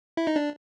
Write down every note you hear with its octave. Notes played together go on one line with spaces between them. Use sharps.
E4
D#4
D4